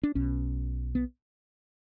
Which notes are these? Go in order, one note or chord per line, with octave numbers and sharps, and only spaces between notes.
D4
B1 B2 C#4
B3